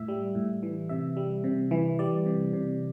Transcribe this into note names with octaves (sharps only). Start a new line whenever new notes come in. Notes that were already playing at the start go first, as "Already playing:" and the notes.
Already playing: A2 E5
G3
A2
E3
C3 E5
G3
C3
E3
G3 D5
C3
C3